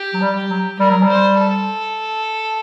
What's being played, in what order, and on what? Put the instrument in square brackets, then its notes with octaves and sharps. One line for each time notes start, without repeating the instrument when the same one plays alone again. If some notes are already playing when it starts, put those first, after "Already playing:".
Already playing: [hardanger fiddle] G4
[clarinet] F#3
G3
[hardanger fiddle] G4
[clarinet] F#3
[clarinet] G3 [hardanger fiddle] A#4
[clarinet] F#3
G3
[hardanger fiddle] C5
A4